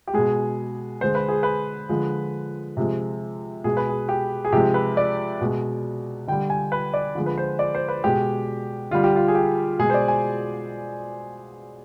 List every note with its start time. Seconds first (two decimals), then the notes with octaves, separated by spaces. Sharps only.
0.07 G4
0.13 B2 G#3 G#4
1.01 D3 G#3 C5
1.15 B4
1.28 G#4
1.43 B4
1.89 D3 F3 G#3
2.77 C3 F3 G#3
3.64 B2 G#3 G#4
3.77 B4
3.89 G#4
4.09 G4
4.45 G#4
4.52 C3 F3 G#3 G4
4.74 B4
4.97 D5
5.41 B2 G#3
6.27 D3 G3 G5
6.50 G#5
6.72 B4
6.94 D5
7.15 D3 F3 G#3
7.26 B4
7.38 C5
7.59 D5
7.75 C5
7.88 B4
8.04 B2 G#3 G4
8.91 D3 G3 F4
9.04 G4
9.16 F4
9.28 G#4
9.35 G4
9.79 B2 G#3 G#4
9.90 C5
9.94 D5
10.08 G#5